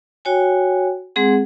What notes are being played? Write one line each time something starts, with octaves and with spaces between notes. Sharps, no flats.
F#4 C#5 G5 G#5
G#3 C4 G#4 F#5